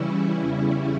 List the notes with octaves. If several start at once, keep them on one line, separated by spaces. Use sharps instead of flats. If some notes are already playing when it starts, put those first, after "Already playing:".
Already playing: C#3 E3 G3 C#4 E4
E2 C#3 G3 C#4 E4